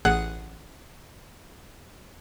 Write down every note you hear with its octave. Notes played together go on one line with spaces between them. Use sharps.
A1 G#4 F#5 F#6